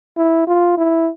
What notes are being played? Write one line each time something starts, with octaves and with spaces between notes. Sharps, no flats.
E4
F4
E4